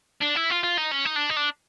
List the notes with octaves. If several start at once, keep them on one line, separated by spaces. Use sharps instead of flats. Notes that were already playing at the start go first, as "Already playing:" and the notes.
D4
E4
F4
F4
D#4
C#4
D#4
D4
D#4
D4